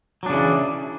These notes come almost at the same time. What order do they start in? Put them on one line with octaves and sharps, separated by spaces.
F#3 D4 C#3 E3